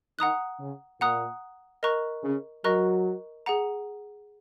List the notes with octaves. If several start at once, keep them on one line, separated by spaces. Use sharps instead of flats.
D#3 D#4 F#5 A#5 D#6 F#6
C#3 C#4
A#2 A#3 F#5 A#5 D#6 F#6
A#4 D#5 A#5 C#6 F#6
C#3 C#4
F#3 F#4 A#4 D#5 A#5 C#6 F#6
G#4 F#5 A#5